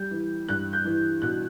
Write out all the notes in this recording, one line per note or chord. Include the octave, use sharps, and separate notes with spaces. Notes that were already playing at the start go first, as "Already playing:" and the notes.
Already playing: G3 G6
E3
G2 F#6
G6
E3
B2 F#6